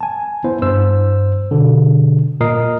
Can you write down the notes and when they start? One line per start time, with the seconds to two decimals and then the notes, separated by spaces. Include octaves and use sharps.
0.01 G#5 A5
0.44 B3 E4 C5
0.62 G2 C5 E6
1.51 B2 D3
2.41 A#2 A#4 D#5 D#6 C7